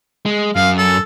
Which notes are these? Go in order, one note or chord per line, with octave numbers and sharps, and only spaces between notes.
G#3
F#2 F5
A4